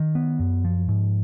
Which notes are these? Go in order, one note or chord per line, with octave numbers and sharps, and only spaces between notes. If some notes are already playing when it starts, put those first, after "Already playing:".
Already playing: D#3
B3
F#2
F3
G#2